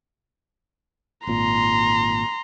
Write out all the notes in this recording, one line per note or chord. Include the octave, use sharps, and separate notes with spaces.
G#1 A#2 A#5 C6